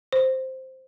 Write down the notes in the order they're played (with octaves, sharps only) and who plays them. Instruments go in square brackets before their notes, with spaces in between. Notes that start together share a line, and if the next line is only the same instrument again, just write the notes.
[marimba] C5